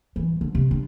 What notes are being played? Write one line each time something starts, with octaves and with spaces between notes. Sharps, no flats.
E3
D3
C3
D4